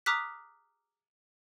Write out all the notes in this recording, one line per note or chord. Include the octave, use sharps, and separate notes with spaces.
A#5 D6 D#6 F6 F#6 B6